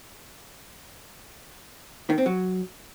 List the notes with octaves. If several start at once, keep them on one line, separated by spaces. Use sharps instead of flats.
D#3
C4
F#3